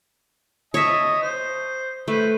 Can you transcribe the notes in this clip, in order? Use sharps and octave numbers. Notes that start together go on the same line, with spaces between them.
C#5 D#5 E5 A5
C5
A3 B4 C5